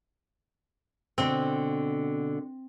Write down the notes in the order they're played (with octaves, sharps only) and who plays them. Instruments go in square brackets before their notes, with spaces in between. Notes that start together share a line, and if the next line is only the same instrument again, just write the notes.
[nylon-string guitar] B2 D3 [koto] C4